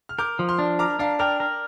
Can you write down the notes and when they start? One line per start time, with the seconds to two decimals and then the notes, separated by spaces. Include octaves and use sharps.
0.09 F6
0.18 A#4 D6 G6
0.39 F3
0.49 C6 F6
0.59 D4
0.79 A#4 A#5 D6
0.99 D4 F5 A#5
1.19 A#4 D5 G5
1.40 A#4